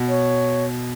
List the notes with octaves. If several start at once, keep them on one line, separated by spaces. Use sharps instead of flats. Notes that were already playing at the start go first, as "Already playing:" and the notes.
Already playing: B2
C#5